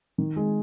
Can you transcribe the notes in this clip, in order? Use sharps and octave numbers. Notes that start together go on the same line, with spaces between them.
D#3
G#3